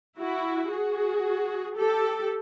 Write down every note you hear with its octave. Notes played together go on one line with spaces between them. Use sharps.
E4 F#4
F#4 G#4
G4 A4